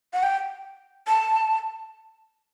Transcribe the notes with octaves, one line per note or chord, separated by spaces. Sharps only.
F#5
G5
A5